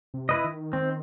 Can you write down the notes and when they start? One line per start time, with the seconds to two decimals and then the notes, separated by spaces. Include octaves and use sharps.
0.14 C3
0.29 E4 B4 D#5
0.44 D#3
0.73 C4